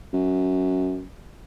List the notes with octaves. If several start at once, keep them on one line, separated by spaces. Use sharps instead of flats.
F#2